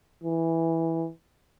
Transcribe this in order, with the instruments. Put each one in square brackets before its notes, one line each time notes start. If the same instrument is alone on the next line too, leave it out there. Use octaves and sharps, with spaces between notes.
[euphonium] E3